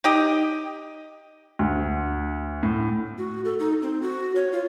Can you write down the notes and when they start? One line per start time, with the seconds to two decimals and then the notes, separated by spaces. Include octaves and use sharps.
0.04 D#4 G4 D#5
1.59 D2
2.63 A2
3.18 F#4
3.45 A4
3.59 D#4
3.82 C4
4.02 F#4
4.36 C#5
4.52 F4